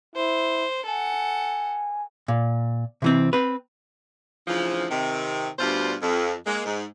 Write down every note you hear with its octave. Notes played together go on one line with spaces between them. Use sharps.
E4 C5
A4 F#5 G#5
A#2
C3 E3 C4
C4 B4
D2 C#3 E3 F3
C3 D#3
D2 G2 B2 G3 F4 C5
F2
G#3 A#3
G#2